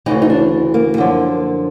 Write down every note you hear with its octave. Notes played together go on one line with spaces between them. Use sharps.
D2 C#3 E3 D#4
D#4
D4
A#3
F#2 D3 F3